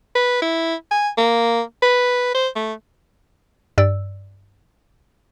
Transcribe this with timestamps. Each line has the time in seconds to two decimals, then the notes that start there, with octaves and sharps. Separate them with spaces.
0.15 B4
0.42 E4
0.91 G#5
1.18 A#3
1.83 B4
2.34 C5
2.56 A3
3.78 G2 D5 E6